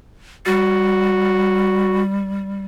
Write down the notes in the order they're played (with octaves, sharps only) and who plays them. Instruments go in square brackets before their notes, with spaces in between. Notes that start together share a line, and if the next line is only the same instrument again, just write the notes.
[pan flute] G3 [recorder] F#4